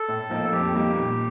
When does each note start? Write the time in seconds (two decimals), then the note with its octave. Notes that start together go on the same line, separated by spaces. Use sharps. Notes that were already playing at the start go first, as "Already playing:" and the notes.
Already playing: A4
0.08 A2
0.30 F3 A#3 D#4
0.52 F2 G4
0.74 D#3 G3 A#3
0.96 A#2